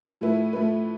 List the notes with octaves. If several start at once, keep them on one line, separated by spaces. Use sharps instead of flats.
A2 F3 A3 E4 B4
A2 F3 A3 E4 B4